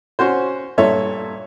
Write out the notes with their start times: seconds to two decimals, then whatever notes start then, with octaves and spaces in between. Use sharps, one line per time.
0.19 C#4 F#4 C5
0.78 G2 A#2 A4 C#5 E5